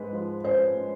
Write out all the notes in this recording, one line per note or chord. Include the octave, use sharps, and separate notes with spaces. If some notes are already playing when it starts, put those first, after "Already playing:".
Already playing: G#2 G#3 B4
F3
C#4 C5
G#3